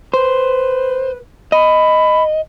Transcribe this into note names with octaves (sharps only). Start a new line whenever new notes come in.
B4 C5
D#5 B5